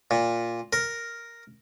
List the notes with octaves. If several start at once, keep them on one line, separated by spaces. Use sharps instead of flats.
A#2
A#4